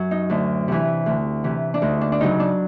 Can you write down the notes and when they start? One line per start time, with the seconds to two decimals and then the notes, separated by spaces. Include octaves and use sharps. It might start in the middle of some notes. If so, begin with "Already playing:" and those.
Already playing: F#2 F#3
0.11 D#4
0.30 D2 D4
0.68 C3 E3
1.06 D2
1.44 C3 E3
1.74 D4
1.82 D2 D#4
2.01 D4
2.12 D4
2.20 C#3 F#3 D#4
2.40 D4